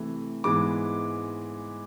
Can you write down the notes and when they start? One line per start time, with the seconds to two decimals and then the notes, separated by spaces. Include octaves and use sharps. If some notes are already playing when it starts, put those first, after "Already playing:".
Already playing: C3 E3 A3
0.44 G#2 E3 G#3 B3 D6